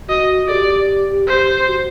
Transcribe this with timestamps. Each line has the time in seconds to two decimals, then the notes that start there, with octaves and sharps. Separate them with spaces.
0.08 F#4 D#5
0.48 A4 D5
0.52 G4
1.28 C5
1.67 F#4